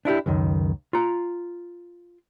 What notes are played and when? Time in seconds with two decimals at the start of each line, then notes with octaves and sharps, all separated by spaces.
0.05 D4 E4 F4 G4
0.26 C#2 F#2 D#3
0.93 F4 A#5